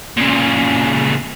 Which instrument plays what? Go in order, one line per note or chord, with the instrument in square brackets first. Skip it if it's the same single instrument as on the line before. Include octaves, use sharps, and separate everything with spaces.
[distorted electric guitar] A#2 C#3